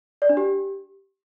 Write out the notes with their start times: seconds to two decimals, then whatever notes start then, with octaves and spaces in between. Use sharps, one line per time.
0.22 D5
0.29 D4
0.37 G4